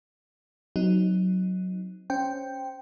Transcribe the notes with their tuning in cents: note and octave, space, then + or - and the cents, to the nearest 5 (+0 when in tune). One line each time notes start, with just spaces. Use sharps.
F#3 +0 C4 -15 D#4 +0
C#4 +0 C5 +0 G5 +0